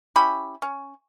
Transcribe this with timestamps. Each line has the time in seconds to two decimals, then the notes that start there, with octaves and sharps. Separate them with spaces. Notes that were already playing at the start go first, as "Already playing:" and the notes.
0.16 C#4 E4 G4 B5
0.62 C#4